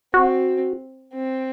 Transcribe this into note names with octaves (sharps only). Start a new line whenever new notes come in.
C4 F#4
C4